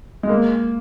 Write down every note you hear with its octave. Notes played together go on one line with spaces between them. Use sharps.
G#3
A#3